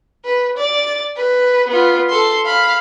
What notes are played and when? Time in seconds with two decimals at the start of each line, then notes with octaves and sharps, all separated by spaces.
0.25 B4
0.57 D5 A6
1.16 B4
1.68 B3 F4
2.10 A4 C6
2.45 F5 B5